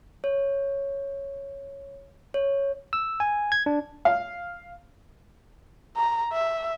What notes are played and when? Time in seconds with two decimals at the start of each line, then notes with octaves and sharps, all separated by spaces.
0.24 C#5
2.34 C#5
2.93 E6
3.20 G#5
3.52 G#6
3.66 D4
4.05 F5
5.97 A#5
6.33 E5